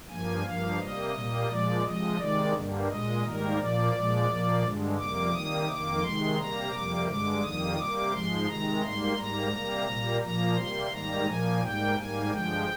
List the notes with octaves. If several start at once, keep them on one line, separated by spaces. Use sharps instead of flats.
G2 F3 A#3 G#5
G2 F3 A#3 F5
C3 G3 A#3 D#5
A#2 G3 A#3
A#2 F3 G#3 D5
C3 F3 G#3 D#5
C3 D#3 G#3 D5
G2 D3 G3 A#3
A#2 G#3 D#5
G#2 D#3 G3 A#3 A#4
A#2 F3 A#3 D5
A#2 F3 G#3
A#2 F3 A#3
G2 D3 G#3
F2 C3 G3 A#3 D6
C3 D#3 G3 A#3 D#6
F2 D#3 A#3 D6
C3 D#3 G#3 C6
C3 G3 A#3 A#5
F2 C3 G3 A#3 D6
G2 D3 G#3 D6
F2 D#3 G3 A#3 D#6
C3 G3 A#3 D6
G#2 F3 G#3 C6
C3 D#3 G#3 A#5
G#2 G3 A#3 C6
G#2 G3 A#3 A#5
C3 G3 A#3
A#2 G3 A#3
A#2 F3 A#3 A#5
C3 G3 A#3 C6
G#2 D#3 G3 A#3 A#5
A#2 F3 A#3 G#5
G#2 G3 A#3 G5
G#2 G3 A#3 G#5
G2 D3 F3 G#3 G5